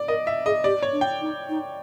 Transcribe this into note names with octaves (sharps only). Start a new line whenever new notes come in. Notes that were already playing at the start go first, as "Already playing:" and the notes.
Already playing: D5
A#4 D#5
E5
G#4 D#5
G4 D5
C#5
D4
G5
D#4
D#4